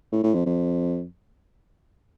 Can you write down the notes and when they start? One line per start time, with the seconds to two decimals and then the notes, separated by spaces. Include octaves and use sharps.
0.12 A2
0.23 A2
0.34 F2
0.46 F2